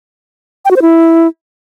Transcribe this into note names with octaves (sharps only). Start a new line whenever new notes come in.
G5
F#4
C5
E4